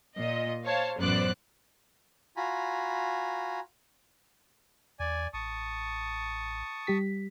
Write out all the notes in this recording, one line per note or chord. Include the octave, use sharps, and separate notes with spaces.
A#2 D#5
C5 C#5 F5 A5
A1 F#2 B3 C5 D5 F#6
F4 F#4 G#5 A#5 B5
E2 D5 G#5
A1 A5 C#6 D#6
G3 G4 B6